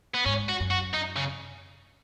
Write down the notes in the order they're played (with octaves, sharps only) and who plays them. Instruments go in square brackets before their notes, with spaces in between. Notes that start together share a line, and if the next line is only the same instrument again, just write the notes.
[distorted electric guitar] B3
[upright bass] G#2 [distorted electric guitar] C#4
[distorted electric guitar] F#4
[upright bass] F#2
[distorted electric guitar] F#4
D#4
C#3